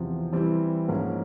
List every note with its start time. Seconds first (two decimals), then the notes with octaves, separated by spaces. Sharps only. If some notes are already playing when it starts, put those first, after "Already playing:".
Already playing: E2 C3 F3
0.32 E3 G3 C4 E4
0.88 G#2 F3 A#3 C#4